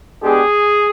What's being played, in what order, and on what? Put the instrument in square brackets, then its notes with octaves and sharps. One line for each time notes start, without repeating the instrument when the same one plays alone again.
[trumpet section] G#3 B3 D4 G4 G#4